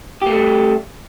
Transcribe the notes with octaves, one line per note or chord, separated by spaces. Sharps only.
G3 A3 A#3 G4